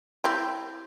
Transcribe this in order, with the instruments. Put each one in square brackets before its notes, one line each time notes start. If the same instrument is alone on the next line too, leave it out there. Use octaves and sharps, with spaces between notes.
[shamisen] C4 E4 G4